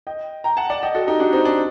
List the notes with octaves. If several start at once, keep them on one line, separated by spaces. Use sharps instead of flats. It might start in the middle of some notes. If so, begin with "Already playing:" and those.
D#5 G5
G5 A#5
F#5 A5
D5 F#5
D#5 G5
F#4 A4
D#4 G4
D4 F#4
C4 D#4
D4